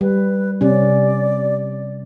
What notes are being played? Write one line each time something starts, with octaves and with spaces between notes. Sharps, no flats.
G3 B4
C3 G3 C#4 D5